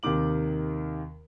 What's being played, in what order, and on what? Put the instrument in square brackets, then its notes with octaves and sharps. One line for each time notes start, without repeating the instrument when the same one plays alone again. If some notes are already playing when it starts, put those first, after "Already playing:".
[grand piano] D#2 C3 D#3 D6 F#7